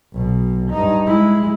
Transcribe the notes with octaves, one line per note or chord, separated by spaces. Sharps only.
B1 B2
G2 D#4
G#3 E4